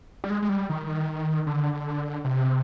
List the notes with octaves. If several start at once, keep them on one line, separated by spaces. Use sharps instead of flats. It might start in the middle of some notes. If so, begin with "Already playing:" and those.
G3
G#3
G#3
G3
D#3
D3
C3